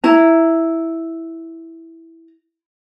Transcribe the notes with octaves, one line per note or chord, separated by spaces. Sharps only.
E4 A#5